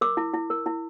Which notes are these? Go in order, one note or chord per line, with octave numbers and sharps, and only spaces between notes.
A#4 D6
E4
E4
A#4
E4